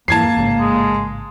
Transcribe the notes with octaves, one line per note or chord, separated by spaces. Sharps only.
F2 G#2 E3 A#3 A5 G#6 C7
A1 G#2 C#3
G#3